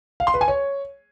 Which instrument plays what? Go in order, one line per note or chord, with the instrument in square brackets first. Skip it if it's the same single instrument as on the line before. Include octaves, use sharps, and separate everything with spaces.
[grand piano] F5
C6
B4
G#5
C#5